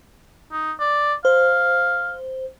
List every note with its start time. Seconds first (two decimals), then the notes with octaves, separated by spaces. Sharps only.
0.52 D#4
0.79 D5
1.25 C5 F5